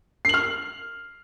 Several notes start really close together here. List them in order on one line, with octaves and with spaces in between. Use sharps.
C7 F#7 F6